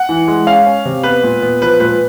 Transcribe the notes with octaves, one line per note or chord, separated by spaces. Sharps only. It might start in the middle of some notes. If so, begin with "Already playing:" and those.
Already playing: F#5
E3
G#3
C#4 F5
C#4
C3
B3 B4
A#2
B3
F3 B4
A#2 B4